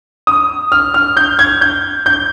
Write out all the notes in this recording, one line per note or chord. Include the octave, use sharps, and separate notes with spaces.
D#6
F6
F6
G6
G#6
G6
G6